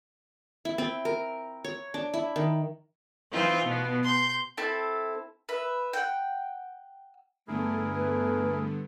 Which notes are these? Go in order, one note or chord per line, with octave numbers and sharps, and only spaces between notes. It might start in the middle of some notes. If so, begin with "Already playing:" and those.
E4
C4
A#4
C#5
D4
E4
D#3
E3 C4 D#4 F4
B2 B3
C6 G6
C4 E4 A4 A5
B4 E5
F#5 G5
G2 D3 A3 B3 E4 G#4 A#4
A3 B4